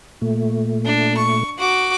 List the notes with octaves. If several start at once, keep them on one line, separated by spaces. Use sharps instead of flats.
A#2 A3
D4
C#6
F#4 D6